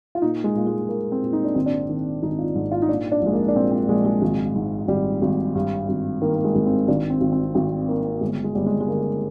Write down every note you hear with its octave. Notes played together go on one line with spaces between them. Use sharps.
F4
A#2 D#4
G#3
A#2
G#3
A#2 A#3
C4
A#2
D#4
D4
G#1 C4
D4
D#3
G#1 D#4
F4
G#2
F4
D#4
A#2 D4
D4
A#1 G#3
A#3
D4
A#2 C4
C4
A#1 G#3
G#3
G#1
G#2
G#1 G3
G#1
G2
G#1
D#3 A#3
A#3
G#3
G#1
C4
G#1 D4
C4
G#1
C4
G#1 C4
D#3 A#3
G1 G#3
G#3
G1 G3
G#3
G#3
D3 A#3